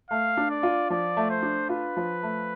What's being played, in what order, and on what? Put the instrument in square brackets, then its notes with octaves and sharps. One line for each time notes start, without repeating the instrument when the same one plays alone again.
[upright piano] A3 [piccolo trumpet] F5
[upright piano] D4
[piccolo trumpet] D5
[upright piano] F4
[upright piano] F3 [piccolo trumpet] D5
[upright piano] A3
[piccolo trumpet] C5
[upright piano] D4
[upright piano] F4 [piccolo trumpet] B4
[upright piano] F3
A3